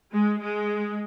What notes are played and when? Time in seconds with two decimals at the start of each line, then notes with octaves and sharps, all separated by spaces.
0.12 G#3
0.41 G#3